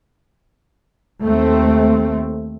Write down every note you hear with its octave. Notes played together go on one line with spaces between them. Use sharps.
D#2 A3 C4